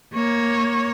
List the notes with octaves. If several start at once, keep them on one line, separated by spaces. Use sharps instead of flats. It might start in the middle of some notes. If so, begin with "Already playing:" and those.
A#3 C#5